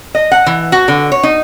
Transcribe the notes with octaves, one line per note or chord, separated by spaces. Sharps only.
D#5
F#5
E3
F#4
D3
C#5
D#4